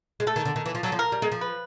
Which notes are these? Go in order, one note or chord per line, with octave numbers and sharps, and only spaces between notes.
G#3
A3 A4
D#3
D3
D#3
E3
F3
F#3 A4
F3
A#4
G3
G#3
F3
B4